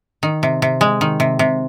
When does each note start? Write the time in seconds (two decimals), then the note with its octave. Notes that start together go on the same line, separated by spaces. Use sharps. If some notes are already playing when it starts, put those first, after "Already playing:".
0.23 D#3
0.43 C3
0.62 C3
0.81 G#3
1.01 D#3
1.20 C3
1.39 C3